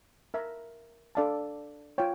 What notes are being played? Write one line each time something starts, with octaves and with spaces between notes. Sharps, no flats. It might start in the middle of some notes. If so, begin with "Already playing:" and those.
A#4 E5 A#5
D4 A4 D5 F5 A5
F4 C#5 G5